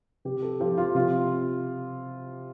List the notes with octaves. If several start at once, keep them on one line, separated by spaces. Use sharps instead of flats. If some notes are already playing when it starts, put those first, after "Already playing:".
C3 G4
A4
F3 G4
F4
C3 F4